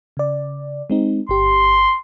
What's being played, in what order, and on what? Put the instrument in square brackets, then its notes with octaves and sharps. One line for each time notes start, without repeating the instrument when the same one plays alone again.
[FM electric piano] C#3 D5
G#3 C4 D#4
[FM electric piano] G1 G4 [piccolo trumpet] C6